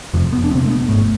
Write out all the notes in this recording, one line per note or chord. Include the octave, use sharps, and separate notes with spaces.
F1 F2 C3 F3
B3
D4
F1 F2 C3 C4
A3
B3
G#1 G#2 A3